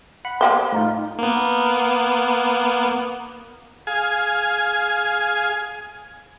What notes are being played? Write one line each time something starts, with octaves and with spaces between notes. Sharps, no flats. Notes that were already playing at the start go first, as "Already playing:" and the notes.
F#5 B5
A#3 G4 C5
A2 D#4 F4
A#3 B3
G#4 F5 G#5